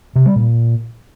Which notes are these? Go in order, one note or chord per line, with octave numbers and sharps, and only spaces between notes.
C3
G3
A#2